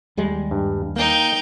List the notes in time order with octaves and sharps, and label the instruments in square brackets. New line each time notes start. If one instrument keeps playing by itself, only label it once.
[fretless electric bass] D#2 G3 G#3
[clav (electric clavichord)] G2
[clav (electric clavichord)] A#3 [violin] D#4 G5